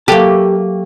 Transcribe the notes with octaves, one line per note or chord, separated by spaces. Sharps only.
F#3 A3 A#3 G4 F#5 A5